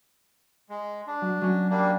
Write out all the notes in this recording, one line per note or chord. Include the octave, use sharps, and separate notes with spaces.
G#3
D4
F#3
F#3 C#4
G3 A#3 D4